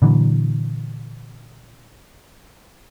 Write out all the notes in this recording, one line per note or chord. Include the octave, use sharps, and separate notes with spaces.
A#2 D3 E3 F#3